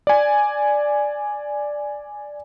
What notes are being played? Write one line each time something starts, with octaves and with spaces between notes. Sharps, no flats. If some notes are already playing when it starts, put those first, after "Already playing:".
D5 G#5